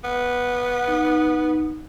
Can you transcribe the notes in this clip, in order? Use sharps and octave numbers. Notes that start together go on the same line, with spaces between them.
B3
D#4